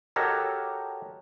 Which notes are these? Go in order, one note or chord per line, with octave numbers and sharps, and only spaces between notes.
F#4 G4 A4 A#4 C#5 D#5